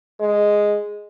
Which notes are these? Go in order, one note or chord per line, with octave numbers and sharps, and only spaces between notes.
G#3